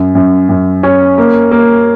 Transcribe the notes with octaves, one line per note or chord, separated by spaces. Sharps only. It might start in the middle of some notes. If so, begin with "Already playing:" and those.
Already playing: F#2
F#2
F#2
C#4
A#3
A#3